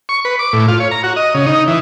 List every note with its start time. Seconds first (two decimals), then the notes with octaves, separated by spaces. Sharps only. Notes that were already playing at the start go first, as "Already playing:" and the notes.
0.09 C#6
0.25 B4
0.39 D6
0.53 A2
0.68 F4
0.80 C#5
0.91 A#5
1.03 F#4
1.16 D#5
1.34 C#3
1.46 D#4
1.68 E3